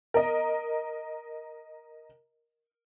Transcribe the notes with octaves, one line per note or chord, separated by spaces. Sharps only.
A#4 D#5